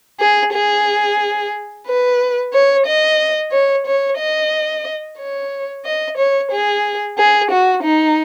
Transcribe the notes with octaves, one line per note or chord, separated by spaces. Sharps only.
G#4
G#4
B4
C#5
D#5
C#5
C#5
D#5
C#5
D#5
C#5
G#4
G#4
F#4
D#4